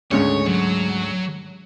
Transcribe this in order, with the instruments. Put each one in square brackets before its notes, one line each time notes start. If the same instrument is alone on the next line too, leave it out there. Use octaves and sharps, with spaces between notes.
[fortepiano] D2 C#3 C#4 [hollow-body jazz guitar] G#2 G#3 A3 [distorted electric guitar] C#5
[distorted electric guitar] F#3